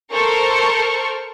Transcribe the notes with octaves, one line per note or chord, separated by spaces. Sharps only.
A4 A#4 C5 C#6